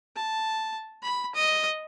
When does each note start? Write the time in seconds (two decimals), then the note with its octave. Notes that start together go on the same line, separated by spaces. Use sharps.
0.16 A5
1.03 B5
1.35 D#5